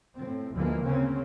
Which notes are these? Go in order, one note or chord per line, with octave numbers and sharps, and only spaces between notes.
A2 C4
D2 E3 F3 G#3 A#3
C#3 A#3 C4 C#4